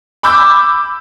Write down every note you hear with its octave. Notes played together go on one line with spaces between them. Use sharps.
B5 D6 E6 G6